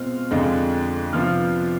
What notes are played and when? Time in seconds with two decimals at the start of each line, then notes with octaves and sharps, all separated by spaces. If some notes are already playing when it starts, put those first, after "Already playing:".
Already playing: B2 G#3 C4 F4 F6
0.31 F2 D3 G#3 D4 F4
1.13 C3 F3 B3 D4 F4 F6